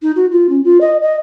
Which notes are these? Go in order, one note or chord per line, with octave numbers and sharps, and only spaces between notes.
D#4
F#4
F4
C#4
F4
D#5
D#5